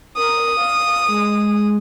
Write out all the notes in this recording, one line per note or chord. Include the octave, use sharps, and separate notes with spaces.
A#4 D#6
F5
G#3